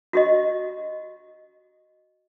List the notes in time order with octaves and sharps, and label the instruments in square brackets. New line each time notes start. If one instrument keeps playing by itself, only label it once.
[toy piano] F#4 G4 D#5